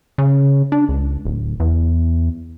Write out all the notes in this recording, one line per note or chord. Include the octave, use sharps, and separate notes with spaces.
C#3
D4
C#2
D1
E2